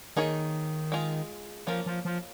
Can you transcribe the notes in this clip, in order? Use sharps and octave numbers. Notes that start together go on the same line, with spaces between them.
D#3 A#3 D#4 G#4 C#5
G#3 F4 G#4
F3 A#3 C#4 F4
F3
F3